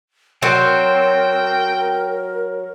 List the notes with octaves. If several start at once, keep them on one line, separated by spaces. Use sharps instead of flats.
F#3 C4 A#4 G5